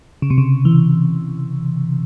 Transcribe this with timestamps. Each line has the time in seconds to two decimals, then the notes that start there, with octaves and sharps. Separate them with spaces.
0.22 C#3
0.30 C3
0.38 C#3
0.65 E3